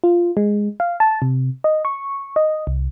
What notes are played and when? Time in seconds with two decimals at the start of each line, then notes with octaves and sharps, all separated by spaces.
0.04 F4
0.37 G#3
0.80 F5
1.00 A5
1.22 C3
1.64 D#5
1.85 C#6
2.36 D#5
2.67 C2